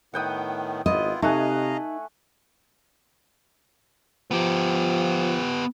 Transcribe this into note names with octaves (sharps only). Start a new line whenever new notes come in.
A2 D#3 B3 F#5 G5 D#6
G#1 B3 E4 F4 D#5
C3 A3 D#4 D#5 F5 F#5 G#5 A#5
F3 B3 G4